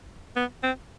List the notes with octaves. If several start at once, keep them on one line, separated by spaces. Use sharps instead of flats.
B3
C4